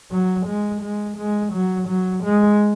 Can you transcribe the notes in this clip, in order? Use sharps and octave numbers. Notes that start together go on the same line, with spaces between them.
F#3
G#3
G#3
G#3
F#3
F#3
G#3